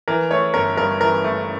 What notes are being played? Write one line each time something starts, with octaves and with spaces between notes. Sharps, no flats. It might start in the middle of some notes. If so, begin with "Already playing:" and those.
E3 A#4
A3 C#5
G1 A#4
G2 A#4
E3 A#4
A3